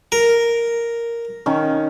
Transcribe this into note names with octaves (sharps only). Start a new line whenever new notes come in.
A#4
D#3 C#4